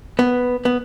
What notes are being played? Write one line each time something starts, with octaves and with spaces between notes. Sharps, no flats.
B3
B3